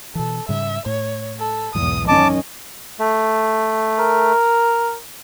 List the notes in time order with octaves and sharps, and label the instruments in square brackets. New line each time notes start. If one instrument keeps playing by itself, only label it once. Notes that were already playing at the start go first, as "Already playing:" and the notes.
[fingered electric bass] B2 E3 [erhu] A4
[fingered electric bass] G#2 C#3 G3 [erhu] E5
[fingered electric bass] A2 [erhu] C#5
[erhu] A4
[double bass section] B1 E2 [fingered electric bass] G#2 E3 [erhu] D#6
[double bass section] F#2 D#3 C#4 [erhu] D#5 [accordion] A5 D6
[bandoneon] A3
[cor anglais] A#4